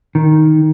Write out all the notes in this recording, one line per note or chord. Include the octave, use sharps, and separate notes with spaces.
D#3